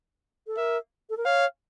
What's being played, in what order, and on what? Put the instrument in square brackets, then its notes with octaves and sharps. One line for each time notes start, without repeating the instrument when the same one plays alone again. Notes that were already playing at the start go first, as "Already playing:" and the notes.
[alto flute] A4
[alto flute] A#4 [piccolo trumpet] E5
[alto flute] A4
A#4
[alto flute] C#5 [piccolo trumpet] F5